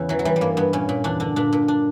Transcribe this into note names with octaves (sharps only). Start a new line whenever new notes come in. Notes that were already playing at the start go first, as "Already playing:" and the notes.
Already playing: E2 C#3
E3 F#3
F#3
E3 G3
G3
G2 A#3
G2 B3
A#2 C#4
A#2
E2 D4
D3 D4
A#2 D4
A#2
D4